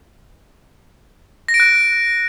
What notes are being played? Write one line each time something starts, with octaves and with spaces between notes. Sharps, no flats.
A#6
D7
F#6